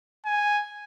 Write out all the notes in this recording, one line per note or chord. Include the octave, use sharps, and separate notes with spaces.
G#5